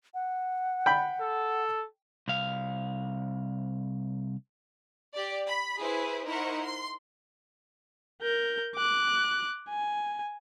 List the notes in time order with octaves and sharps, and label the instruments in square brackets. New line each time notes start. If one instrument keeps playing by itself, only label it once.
[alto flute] F#5
[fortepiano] G5 B5
[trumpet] A4
[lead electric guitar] C2 F5
[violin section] G4 D5
B5
E4 G#4 B4 C5
D#4 E4 A#4 C5 F#5 C#6
C6
[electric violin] A#4 G6
D6 F#6
G#5